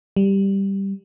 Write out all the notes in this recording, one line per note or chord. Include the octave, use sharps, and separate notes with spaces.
G3